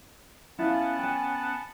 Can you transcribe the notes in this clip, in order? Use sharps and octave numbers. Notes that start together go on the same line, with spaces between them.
B3 C#4 E4 F5 F#5 A5
G5 G#5